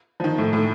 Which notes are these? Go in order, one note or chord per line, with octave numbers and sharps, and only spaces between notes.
F3
D#3
A2
A2